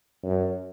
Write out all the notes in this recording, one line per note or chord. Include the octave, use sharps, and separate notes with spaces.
F#2